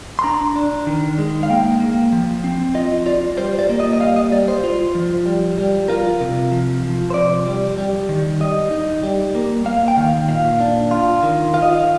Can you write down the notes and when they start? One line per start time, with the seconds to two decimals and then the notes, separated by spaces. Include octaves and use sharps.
0.19 C6
0.23 D4 A#5
0.56 D4
0.87 D#3
1.18 G#3
1.43 F5
1.50 A#3 G5
1.80 A#3
2.13 F3
2.44 C4
2.74 F4 D#5
3.06 F4 D5
3.37 G3 C5
3.59 D5
3.69 A#3
3.80 D#5
3.93 D#5
4.00 G3 F5
4.16 D#5
4.31 G3 D5
4.48 C5
4.64 F4
4.95 F3
5.26 G3
5.58 G3
5.88 F4 A#4
6.21 C3
6.52 F3
6.84 F3
7.10 C5
7.14 C3 D5
7.46 G3
7.78 G3
8.09 D#3
8.40 G3 D#5
8.71 D#4
9.03 G3
9.35 A#3
9.65 A#3 F5
9.88 G5
9.97 D#3 F5
10.28 A#2 F5
10.60 D4
10.91 F4
11.23 D#3
11.54 F4 F5
11.62 D#5
11.73 F5